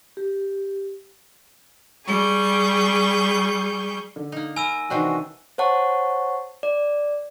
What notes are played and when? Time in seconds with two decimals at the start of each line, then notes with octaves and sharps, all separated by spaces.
0.17 G4
2.07 G3 G#4 C#6 G6
4.16 D3
4.32 A#3 D#4
4.56 A#4 G#5 B5 E6 D#7
4.90 C3 D#3 E3 D4 F#4 C5 D5 G5
5.58 C5 C#5 F#5 A5 C#6
6.63 D5